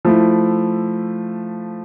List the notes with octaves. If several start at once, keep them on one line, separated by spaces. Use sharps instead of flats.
F3 A3 E4